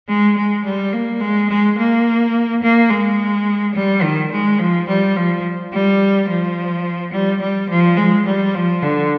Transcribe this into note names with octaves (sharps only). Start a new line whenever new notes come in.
G#3
G#3
G3
A#3
G#3
G#3
A#3
A#3
G#3
G3
D#3
G#3
F3
G3
F3
G3
F3
G3
G3
F3
G#3
G3
F3
D3